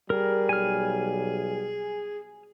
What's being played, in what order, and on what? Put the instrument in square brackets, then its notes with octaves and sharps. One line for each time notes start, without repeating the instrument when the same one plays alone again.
[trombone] G3 [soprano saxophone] G#4 [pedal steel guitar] A#4
[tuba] B1 [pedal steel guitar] G#5 F6